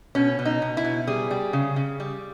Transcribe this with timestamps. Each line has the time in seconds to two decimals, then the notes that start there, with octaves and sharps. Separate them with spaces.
0.15 B2 C#4
0.39 B2
0.46 D#4
0.62 B2
0.77 E4
0.85 B2
1.07 G3 G#4
1.31 G3
1.53 C#3
1.76 C#3
2.00 G3